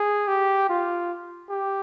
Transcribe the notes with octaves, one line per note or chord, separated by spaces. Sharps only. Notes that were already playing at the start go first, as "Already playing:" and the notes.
Already playing: G#4
G4
F4
G4